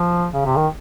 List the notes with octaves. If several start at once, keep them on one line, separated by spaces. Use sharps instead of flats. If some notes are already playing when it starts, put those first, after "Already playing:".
Already playing: F3
C#3
C3
D#3